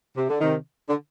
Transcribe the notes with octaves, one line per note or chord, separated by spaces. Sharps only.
C3
D3
C3 D#3
D3